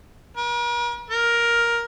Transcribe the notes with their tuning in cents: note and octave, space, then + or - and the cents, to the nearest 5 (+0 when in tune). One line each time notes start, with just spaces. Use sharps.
A#4 +45
A#4 +10